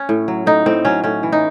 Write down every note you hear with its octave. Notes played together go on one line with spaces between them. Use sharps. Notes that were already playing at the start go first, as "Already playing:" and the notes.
Already playing: C#4
A2
F#3
A2 D#4
A2 C4
F#3 C#4
A2 C#4
E3
D#4